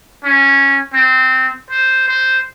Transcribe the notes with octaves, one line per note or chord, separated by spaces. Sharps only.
C#4
C4
C5
C5